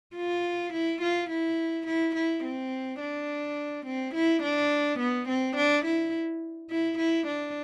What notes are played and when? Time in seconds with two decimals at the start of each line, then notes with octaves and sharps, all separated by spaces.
0.16 F4
0.73 E4
1.01 F4
1.30 E4
1.87 E4
2.15 E4
2.44 C4
3.00 D4
3.86 C4
4.14 E4
4.43 D4
4.99 B3
5.28 C4
5.56 D4
5.85 E4
6.70 E4
6.98 E4
7.27 D4